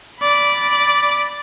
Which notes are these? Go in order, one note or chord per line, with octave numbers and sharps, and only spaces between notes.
D5 B5